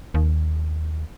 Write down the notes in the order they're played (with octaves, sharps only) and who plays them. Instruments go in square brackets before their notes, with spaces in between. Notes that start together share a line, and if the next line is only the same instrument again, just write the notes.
[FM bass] D#2